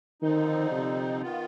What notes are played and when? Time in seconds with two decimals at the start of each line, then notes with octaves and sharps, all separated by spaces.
0.22 D3 D#3 F3 C4 D#4
0.72 C3
1.22 D#3 B3 F4